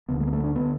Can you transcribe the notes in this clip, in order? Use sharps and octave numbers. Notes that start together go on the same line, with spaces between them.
D2 D3 B3
A3
B3
A3
D4
D3 B3